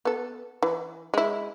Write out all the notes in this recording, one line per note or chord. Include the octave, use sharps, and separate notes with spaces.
B3 A4
E3
G#3 E4